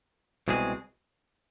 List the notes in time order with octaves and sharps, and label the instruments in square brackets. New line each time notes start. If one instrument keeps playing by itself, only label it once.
[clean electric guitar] C2 B2 G#3 C4 G#4